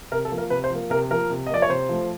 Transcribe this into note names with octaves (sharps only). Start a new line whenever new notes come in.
C3 A#4
A4
F3 A#3
A#4
C3 B4
C5
F3 A#3
C3 A#4
F3 A#3 A#4
C3
D#5
F3 A#3 D5
C#5
C3 C5
F3 A3